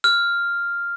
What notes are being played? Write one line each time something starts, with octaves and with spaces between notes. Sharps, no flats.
F6